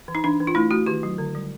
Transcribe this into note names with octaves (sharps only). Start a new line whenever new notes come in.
E3
D#4
E3 D4
E3
F4
A3 E4
A3 F#4
D#3 G4
F#3
D3
G3